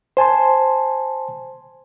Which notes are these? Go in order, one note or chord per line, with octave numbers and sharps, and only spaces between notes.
C5 G#5 A5 C6